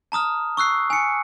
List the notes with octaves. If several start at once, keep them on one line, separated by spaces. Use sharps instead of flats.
A5 A#5 D#6 F6
C#6 E6 F#6 C7
G#5 C#7